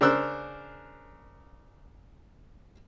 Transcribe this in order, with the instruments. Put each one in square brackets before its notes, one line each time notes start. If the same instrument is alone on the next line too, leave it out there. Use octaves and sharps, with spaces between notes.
[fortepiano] C#3 D4 A#4 C5 E6 F#6